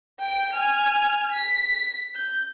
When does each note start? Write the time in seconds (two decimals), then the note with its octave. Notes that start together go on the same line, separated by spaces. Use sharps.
0.20 G5 D7
0.53 G#5 F6
1.32 B6
2.15 G6